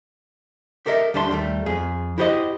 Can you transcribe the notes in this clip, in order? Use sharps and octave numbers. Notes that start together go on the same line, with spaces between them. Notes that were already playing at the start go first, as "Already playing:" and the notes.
G4 A4 A#4 D#5 E5
D2 G3 D4 A5 A#5 C6
D#2 G3 A3
F2 G#4
E4 F#4 G4 C5 C#5 D#5